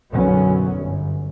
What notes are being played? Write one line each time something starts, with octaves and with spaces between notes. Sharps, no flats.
B1 F#2 D3 F#3 B3 C#4
G1